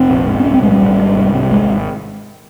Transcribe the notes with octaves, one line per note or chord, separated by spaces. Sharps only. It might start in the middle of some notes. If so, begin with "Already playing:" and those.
Already playing: F1 C4
A#1
G#2
C4
C2 C#4
C4
A#2 G#3
G3
G#1
G#2
C2
C3
G#1 G#3